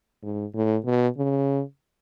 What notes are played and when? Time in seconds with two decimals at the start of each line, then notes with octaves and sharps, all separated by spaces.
0.23 G#2
0.54 A2
0.86 B2
1.17 C#3